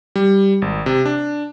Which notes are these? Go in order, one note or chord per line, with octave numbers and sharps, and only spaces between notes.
G3
G#1
C3
D4